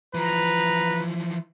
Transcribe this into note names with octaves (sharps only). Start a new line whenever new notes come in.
E3 F3 B4 A#5